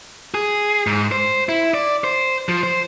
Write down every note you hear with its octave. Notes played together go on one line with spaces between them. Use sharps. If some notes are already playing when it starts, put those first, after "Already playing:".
G#4
G#2
C5
E4
D5
C5
F3
C5